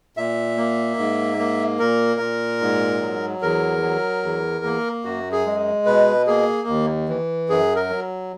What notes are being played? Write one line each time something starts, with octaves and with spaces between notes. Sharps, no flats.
A#2 E5
A#3
G#2
A#3
A#2 A#4
A#2
G#2
F#3
E2 A#4
F#3
E2
A#3
F#2 F#4
G#4
G#3
B2 B4
A#3 G#4
D#2
E3
F#2 G#4
A#4
F#3